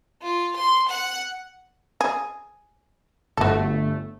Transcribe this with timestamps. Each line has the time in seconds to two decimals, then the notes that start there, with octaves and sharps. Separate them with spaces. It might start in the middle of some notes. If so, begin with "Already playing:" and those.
0.22 F4
0.56 C6
0.88 F#5
2.01 G#4
3.37 G1 A3 F#4 A4